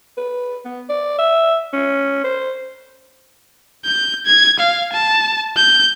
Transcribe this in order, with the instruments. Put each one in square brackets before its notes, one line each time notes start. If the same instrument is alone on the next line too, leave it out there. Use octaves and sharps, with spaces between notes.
[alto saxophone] B4
B3
D5
E5
C#4
C5
[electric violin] G6
G#6
F5
A5
G6